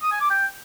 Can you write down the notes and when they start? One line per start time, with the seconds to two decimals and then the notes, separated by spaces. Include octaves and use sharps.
0.02 D#6
0.11 G#5
0.21 D6
0.30 G5